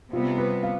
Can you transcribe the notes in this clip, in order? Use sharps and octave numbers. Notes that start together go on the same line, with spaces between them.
C3 G3 B3 F4
B4
F5